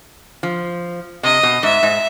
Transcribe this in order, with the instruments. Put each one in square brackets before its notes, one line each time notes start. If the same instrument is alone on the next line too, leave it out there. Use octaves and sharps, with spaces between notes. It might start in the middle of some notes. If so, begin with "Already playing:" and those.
[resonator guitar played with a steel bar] F3
[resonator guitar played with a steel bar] C3 [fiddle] D#5
[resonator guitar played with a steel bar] B2
[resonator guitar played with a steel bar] G#2 [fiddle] E5
[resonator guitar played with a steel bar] G#2